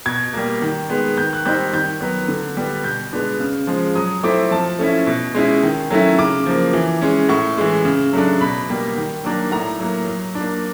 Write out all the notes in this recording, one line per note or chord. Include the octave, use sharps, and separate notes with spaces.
B2 G#6
G3 A#3
D#3
G#3 B3
D#3 G6
F#6
G3 C4 D#4 G6
D#3 G6
F#3 B3
D3
G3 B3
B2 G6
G#3 B3 D4
C#3
F3 G#3
F#3 D#6
A3 C4 E4 D6
F3 A5
A3 C#4 E4
B2
G#3 C#4 E4
D#3
F#3 A3 C#4 E4
C#3 D6
F3 A#3
E3
G#3 C#4
A2 C#6
E3 G#3
C#3
F#3 A3 D4
B2 B5
G3 A#3
D#3
F#3 A#3 D4
A2 A#5
F#3 A#3
F#3
D4
A#3